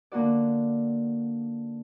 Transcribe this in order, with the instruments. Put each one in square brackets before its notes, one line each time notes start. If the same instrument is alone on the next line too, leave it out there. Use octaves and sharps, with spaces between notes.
[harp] D3 A#3 D#4 F#4 D5